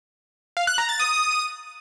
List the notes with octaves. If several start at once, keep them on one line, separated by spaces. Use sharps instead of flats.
F5
F#6
A#5
A6
D#6